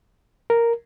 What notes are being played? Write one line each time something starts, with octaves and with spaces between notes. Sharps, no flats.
A#4